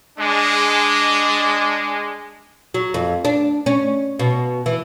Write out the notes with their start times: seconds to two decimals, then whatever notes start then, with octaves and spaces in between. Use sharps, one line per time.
0.18 G#3 D4
2.74 F#3
2.94 F2
3.25 D4
3.66 C#4
4.19 B2
4.66 E3